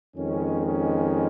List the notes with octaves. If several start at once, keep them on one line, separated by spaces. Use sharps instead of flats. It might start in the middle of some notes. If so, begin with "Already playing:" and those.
F2 D#3 G#3 C#4
C#4